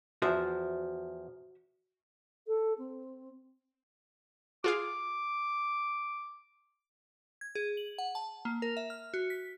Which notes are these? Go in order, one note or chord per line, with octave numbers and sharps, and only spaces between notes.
E2 F3 F#4 C5 E5
A4
C4
F4 G#4 F5 D6
G#6
G#4
F#7
F#5
A5
A#3
A#4
E5
F6
F#4
B6